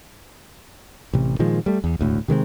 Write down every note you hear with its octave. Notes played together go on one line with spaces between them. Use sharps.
A1 C3
A#2 D#3 F3 G#3
G3 A3
E2
E1 D2 A2
C3 D#3 G#3 C4